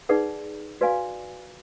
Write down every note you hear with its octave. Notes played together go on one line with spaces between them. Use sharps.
D#4 G#4 B4 D5 F#5
F#4 B4 D5 F5 G#5